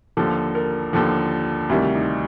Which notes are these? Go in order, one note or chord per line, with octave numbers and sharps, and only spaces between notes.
D#2 D3 F3 A4
A#4
D#2 D3 F3 A4
D2 C3 D#3 G3 E4
D#4